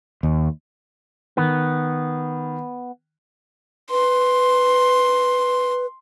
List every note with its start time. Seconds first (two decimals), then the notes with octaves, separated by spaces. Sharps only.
0.23 D#2
1.37 D#3 B3
3.91 B4 C6